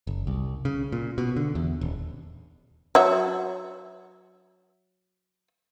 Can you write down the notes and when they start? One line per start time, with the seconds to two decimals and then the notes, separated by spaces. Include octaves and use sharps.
0.07 F#1
0.27 C2
0.65 C#3
0.92 A#2
1.18 B2
1.36 D3
1.55 E2
1.81 D#1
2.95 F#3 E5